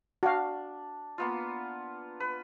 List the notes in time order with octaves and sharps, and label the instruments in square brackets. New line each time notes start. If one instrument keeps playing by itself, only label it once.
[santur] D4 [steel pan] F#4 F5
[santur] A#3 B3 F4
B4